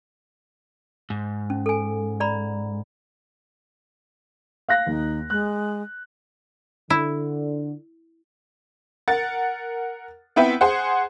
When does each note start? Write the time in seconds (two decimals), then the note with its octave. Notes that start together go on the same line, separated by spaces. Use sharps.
1.10 G#2
1.50 C#4
1.66 A4 G#5
2.20 D5 A#5 B5
4.69 F5 F#6 A#6
4.87 D#2 D#4
5.30 G#3 F#6
6.90 D3 E4
9.08 A#4 F#5 A6
10.36 B3 C4 E4 B4 E5 G5
10.61 G#4 C5 F#5